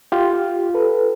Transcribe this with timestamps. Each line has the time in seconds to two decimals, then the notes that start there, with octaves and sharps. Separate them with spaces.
0.12 F4 G4
0.74 A4 B4